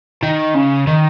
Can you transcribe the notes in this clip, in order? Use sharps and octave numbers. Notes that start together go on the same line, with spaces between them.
D#3
C#3
D#3